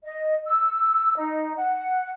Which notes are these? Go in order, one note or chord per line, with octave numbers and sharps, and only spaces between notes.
D#5
E6
D#4
F#5